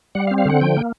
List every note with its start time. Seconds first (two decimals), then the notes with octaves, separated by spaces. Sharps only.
0.15 G3 F#5
0.27 F5
0.31 C4
0.38 F5
0.45 D3 F#5
0.61 F3 G5
0.77 A#3